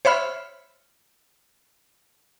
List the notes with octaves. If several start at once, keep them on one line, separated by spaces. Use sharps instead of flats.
C5 C#5 E5 B5 F6